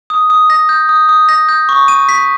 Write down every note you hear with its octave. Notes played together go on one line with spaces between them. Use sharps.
D#6
D#6
A#6
G6
D#6
D#6
A#6
G6
C#6
D#7
B6